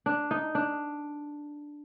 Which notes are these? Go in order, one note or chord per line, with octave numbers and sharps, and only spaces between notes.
D4
D#4
D4